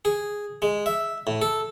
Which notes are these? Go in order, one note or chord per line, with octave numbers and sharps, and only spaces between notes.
G#4
G#3
E5
A2
A4